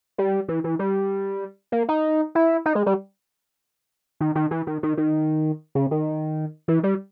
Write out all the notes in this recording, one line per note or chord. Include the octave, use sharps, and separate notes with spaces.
G3
E3
E3
G3
A#3
D#4
E4
D#4
G#3
G3
D#3
D#3
E3
D#3
D#3
D#3
C#3
D#3
E3
G3